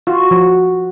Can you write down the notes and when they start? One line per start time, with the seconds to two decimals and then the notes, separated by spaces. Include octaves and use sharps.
0.07 F4 F#4
0.31 F3